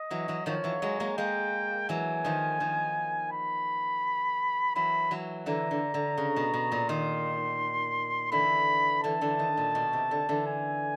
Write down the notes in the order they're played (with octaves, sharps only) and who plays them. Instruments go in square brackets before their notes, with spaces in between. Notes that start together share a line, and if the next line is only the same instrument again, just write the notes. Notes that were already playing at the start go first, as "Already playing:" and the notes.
Already playing: [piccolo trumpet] D#5
[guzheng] E3 F#3
E3 F#3
[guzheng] D#3 F3 [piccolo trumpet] C#5
[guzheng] E3 F#3
F#3 G#3
G#3 A#3
[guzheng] G#3 A#3 [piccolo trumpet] G5
[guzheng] E3 F#3 [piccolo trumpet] G#5
[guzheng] D#3 F3
D#3 F3
[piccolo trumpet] B5
[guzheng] E3 F#3 [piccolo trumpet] B5
[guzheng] E3 F#3
[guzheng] D3 E3 [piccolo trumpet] A#5
[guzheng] D3
D3
C#3
B2
B2
A#2
[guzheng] D#3 [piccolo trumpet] C6
[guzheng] D3 E3 [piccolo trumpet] B5
[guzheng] D3 E3 [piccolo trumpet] A5
[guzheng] D3 E3
D#3
A#2
B2
C3
D3
D3 E3
[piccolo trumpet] G#5